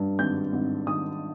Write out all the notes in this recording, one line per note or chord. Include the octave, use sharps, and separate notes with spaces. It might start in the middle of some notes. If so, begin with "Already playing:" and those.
Already playing: G2
G#1 G6
G#1
D#3 D#6